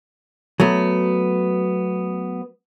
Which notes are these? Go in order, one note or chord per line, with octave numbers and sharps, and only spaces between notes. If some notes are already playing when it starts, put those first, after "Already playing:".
F#3 A3 B3